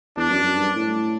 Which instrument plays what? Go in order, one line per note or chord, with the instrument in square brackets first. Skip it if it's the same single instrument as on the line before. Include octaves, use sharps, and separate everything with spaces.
[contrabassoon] E2 [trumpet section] D4
[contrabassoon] F#2
F#2
G2
A2